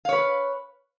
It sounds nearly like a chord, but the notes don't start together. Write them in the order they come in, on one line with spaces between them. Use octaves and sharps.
F5 C#5 B4